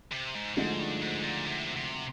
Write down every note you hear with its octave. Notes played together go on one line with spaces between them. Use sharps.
C3
G#2
D2 G#2 D3 F3 G#3 D#4
G2
G#2
A#2
C3
C3